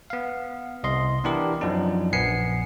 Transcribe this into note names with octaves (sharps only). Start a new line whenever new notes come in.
B3 F5
C2 D#5 C6
E3 B3 D4 E4 G4 A#4
F#2 F3 D4 D#4
A#1 B3 G#5 C7 C#7